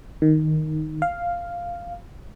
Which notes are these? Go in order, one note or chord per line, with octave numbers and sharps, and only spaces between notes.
D#3
F5